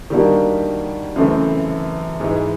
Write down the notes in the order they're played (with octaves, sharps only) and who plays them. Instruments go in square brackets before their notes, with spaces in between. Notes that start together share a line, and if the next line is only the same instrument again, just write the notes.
[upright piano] D#3 G3 A#3 D4 F#4
F#2 C#3 E3 A3 C4
G#2 E3 G#3